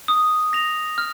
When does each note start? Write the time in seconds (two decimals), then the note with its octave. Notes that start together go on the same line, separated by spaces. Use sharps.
0.08 D#6
0.53 A#6 F7
0.98 F6